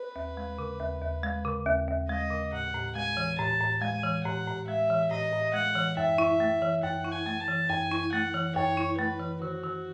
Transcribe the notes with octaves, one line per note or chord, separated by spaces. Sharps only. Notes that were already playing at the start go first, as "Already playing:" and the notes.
Already playing: B4
D#2
G#3
C#3
D#2
D#2
G#3
C#3
D#2
D#2
G#3 D#5
C#3
A2 F#5
A2
G#3 G#5
E3
A2 A5
A2
G#3 G#5
E3
A2 F#5
A2
G#3 E5
E3
A2 D#5
A2
G#3 F#5
E3
F#2 E5
E4
A3
E3
F#2 F#5
E4
G#5
A3
A5
E3
F#2 G#5
E4
A3 F#5
E3
F#2 C#5
E4
A3 B4
E3
D#3 F#4
D#3